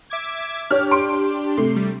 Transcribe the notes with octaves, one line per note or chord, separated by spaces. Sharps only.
E5 D6 G#6
D4 G4 C#5 F6
C6 D7
C3 A3 C6
G3